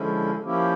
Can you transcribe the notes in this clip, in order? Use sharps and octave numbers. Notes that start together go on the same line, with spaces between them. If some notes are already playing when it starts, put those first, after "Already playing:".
Already playing: D3 F3 G#3 C#4 E4
F3 A#3 C#4 E4 G4